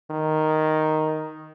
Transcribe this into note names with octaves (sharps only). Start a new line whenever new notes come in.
D#3